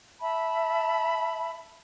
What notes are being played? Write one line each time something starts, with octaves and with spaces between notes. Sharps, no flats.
E5 A5 B5